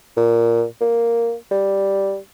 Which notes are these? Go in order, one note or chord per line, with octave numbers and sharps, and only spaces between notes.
A#2
A#3
G3